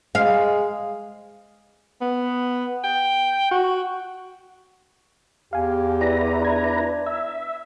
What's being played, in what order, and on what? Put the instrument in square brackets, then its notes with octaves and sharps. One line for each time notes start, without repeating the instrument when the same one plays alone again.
[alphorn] G#3 [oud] F5
[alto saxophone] B3
G5
F#4
[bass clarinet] E2 [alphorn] G4 [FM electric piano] F5 G#5
[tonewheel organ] E4 B4 A#5 [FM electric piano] D5
[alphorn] D4 [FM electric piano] D5 G#6
[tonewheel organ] E5